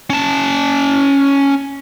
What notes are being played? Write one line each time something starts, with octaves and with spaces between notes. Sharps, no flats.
C#4 A5